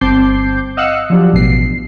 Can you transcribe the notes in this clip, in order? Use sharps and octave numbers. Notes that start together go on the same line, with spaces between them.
G1 C4 A5 D6 G6 C7
D#5 F5 F#5 E6 F#6 C#7
F3 F#3 D4 G4
A1 B2 C7